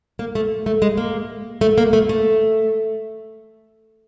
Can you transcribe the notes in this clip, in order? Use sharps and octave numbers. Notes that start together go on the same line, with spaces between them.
A#3
A3
A3
G#3
A#3
A3
A#3
A3
A3